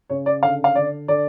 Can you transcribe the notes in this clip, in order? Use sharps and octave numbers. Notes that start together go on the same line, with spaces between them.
C#3 C#5
D5
D3 F5
F5
D3 D5
D3 D5